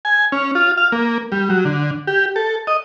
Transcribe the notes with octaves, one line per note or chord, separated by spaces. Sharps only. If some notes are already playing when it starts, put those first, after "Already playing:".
G#5
C#4
F4
F5
A#3
G3
F#3
D3
G4
A4
D#5